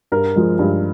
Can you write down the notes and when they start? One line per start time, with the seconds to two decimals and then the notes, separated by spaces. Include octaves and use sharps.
0.12 G2 A#4
0.36 F3 G#3
0.59 G2